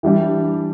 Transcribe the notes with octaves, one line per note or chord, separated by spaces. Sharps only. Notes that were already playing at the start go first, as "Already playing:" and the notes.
E3 G3 D4 G4